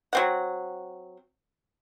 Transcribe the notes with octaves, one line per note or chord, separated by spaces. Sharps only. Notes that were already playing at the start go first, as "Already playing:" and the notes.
F#3 C4 F#5